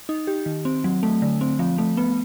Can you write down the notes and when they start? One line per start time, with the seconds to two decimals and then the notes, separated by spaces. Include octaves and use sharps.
0.09 D#4
0.27 G4
0.46 D#3
0.65 C4
0.84 F#3
1.03 A3
1.22 D3
1.41 C4
1.59 F3
1.78 A3
1.97 B3